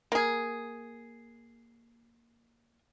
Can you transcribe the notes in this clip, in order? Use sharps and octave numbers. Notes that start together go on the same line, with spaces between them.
A#3 G#4